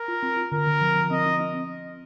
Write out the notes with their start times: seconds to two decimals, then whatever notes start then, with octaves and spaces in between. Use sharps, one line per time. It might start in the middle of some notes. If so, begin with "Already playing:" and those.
Already playing: A#4
0.08 F4
0.23 C4
0.37 F4
0.52 D3 A#4
0.67 D3
0.81 F3
0.96 F3
1.11 C4 D#5
1.26 C4
1.41 C4